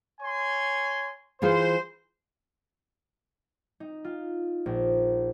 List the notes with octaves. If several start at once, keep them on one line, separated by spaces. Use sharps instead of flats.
C#5 G#5 C6
E3 F4 G#4 C5
D#4
F4
A#1